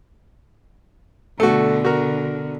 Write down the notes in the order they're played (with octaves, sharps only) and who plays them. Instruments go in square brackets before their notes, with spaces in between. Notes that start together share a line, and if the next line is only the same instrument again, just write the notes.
[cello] B2 D3 [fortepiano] A3 F#4
[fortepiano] F#4 A#4